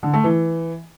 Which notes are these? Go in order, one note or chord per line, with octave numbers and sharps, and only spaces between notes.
D3
A3
E3